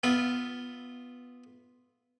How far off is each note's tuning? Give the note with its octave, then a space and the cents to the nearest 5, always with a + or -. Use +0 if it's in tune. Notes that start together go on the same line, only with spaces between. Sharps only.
B3 +0 F4 +0 E5 -25